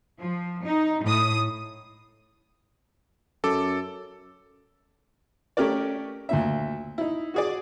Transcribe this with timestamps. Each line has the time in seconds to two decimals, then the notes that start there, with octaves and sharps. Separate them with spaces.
0.18 F3
0.65 D#4
1.02 A2 D#6
3.44 F#2 A4 D6
5.57 A3 C#4 G4 A#4 D5
6.29 D2 A#2 E5
6.98 D#4 E4
7.34 F#4 G#4 D5